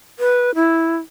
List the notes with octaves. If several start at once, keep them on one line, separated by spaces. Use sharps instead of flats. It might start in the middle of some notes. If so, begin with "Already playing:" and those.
B4
E4